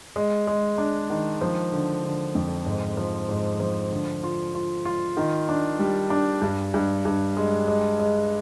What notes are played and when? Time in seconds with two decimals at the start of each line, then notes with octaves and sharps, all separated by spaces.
0.16 G#3
0.47 G#3
0.78 D4
1.10 D#3
1.41 F3
1.72 D3
2.03 D3
2.35 F2
2.66 G#2
2.97 F3
3.29 G#2
3.60 F3
3.91 D3
4.23 F4
4.55 F4
4.85 F4
5.17 D#3
5.49 D4
5.79 G3
6.10 D4
6.42 G2
6.74 G2
7.05 G2
7.37 G#3
7.68 G#3
7.99 G#3